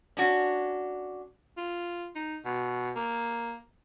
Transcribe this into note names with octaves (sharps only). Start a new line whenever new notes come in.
C#4 D4 F#4
F4
D#4
B2
A#3